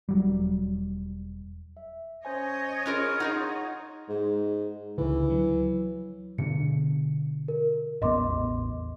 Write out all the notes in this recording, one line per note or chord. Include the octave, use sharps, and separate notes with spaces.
E1 F#3 G3
E5
C#4 C5 C#5 D#5 G#5
C#4 F4 G#4 A#4 B5 F#6
D#4 F4 G#4 F#5 C#6
G#2
C#2 D3 E3
F#3
B2 D3 C#7
A#4
A1 E2 B3 D#5 C6 D6